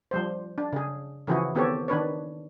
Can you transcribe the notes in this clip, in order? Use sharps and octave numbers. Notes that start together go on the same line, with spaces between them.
F3 G3 C5
D4
C#3 G#4
C#3 E3 F3 E4 F#4 G#4
D#3 B3 C4 G4 A4 C#5
D#3 D4 B4 C#5